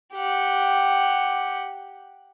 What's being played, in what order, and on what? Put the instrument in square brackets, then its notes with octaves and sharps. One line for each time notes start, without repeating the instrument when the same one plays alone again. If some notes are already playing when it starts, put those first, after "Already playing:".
[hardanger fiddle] G4 F#5